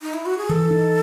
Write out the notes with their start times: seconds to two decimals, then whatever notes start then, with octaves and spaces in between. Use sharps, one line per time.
0.02 D#4
0.14 E4
0.26 F#4
0.38 G#4
0.49 E3 A4
0.71 D#4